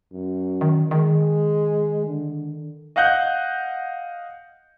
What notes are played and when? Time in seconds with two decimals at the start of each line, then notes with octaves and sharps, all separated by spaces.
0.12 F#2
0.61 D#3
0.91 D#3 G#3
2.06 D3
2.96 D#5 F5 F#5 F#6 G6